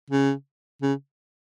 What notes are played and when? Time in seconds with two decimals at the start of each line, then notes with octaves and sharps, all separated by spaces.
0.10 C#3
0.82 C#3